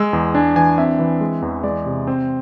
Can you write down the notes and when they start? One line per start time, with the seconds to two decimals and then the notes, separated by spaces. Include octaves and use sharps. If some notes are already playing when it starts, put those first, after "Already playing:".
Already playing: G#3 E6
0.13 E2
0.35 D4 G#5
0.56 E3 G#5
0.78 C4 E5
0.99 E3
1.21 G#3
1.42 E2
1.64 G#3 D5
1.86 C3
2.07 C4 C5